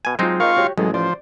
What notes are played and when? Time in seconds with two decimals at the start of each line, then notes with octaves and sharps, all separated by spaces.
0.05 B2 G#5
0.19 F#3 G#3 C4 D#4 F4
0.40 F4 A#4 D#5 F5 C#6
0.57 F#4 G4 C#5
0.78 A1 F#3 G#3 A4
0.94 F3 C5 D5